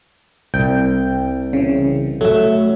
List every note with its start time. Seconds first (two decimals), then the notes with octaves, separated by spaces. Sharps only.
0.54 C2 G5
1.53 C#3 E3
2.21 F#3 A3 E5